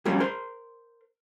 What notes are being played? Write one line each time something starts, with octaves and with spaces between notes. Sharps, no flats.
F2 F#3 G3 A#3 C#4
A#4 C5 C6